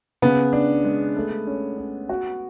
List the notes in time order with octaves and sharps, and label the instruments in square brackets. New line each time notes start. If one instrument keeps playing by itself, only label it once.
[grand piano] C#3 [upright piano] B3
[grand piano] D4
G#3
A3
C#4
C#4
F#4